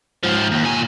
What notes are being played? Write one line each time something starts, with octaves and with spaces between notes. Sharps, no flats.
G#2 F3
D#2
A#2 G#5